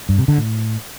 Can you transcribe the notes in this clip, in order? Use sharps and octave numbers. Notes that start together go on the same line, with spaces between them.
G2
C3
D3
A2